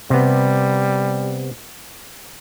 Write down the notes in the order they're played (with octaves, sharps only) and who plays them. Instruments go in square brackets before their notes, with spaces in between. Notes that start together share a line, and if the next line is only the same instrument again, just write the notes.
[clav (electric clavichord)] C3 B3 [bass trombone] G3